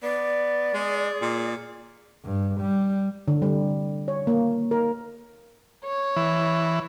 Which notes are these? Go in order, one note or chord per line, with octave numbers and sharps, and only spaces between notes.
B3 D5
G#3 G#4
A#2
G2
G3
D3
G3
C#5
A#3
A#4
C#5
E3